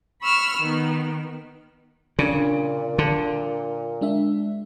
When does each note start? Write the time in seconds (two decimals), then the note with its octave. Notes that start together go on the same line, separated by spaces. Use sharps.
0.22 B5 C#6 E6 F6
0.59 D#3 B3
2.19 A#2 C#3 D4 D5
2.98 D3
4.01 G#3 D4 E5